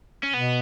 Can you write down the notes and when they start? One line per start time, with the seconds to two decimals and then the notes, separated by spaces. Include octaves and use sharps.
0.23 C#4
0.34 B2 B3